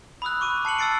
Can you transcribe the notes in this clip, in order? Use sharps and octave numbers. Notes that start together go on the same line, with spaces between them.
B5 D#6 E6 F#6
C#6 D6 D#7
A5 C7 C#7 F#7
E6 F6 A6 C7 D7